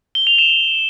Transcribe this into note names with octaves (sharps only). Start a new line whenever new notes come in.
G7
F7
E7